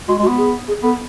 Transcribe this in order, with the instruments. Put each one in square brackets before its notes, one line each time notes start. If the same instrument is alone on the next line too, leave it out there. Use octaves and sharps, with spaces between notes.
[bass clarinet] G#3 [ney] F#4
[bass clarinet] G#3
[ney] F#4
[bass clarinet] B3
[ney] G#4
G#4
[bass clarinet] B3 [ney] A4